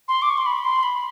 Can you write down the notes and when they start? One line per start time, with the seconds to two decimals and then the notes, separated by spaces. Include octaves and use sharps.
0.08 C6
0.22 D6
0.30 C#6
0.38 C6
0.46 B5
0.64 C6
0.83 B5